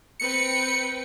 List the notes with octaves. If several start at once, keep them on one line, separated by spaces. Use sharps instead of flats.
C4 B4 G5 C#7